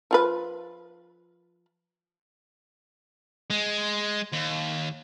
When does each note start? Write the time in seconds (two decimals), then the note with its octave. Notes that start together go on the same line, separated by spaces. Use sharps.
0.11 F3 F4 B4
3.50 G#3
4.33 D#2